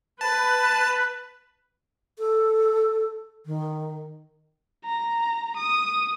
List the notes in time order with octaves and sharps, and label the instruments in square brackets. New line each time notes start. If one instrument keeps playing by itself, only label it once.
[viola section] B4 [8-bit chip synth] A5
[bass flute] A4
D#3
[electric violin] A#5
D#6